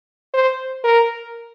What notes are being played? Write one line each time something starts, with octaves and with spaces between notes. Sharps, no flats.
C5
A#4